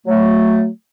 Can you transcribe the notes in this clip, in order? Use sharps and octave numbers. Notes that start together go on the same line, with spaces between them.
F#3 A3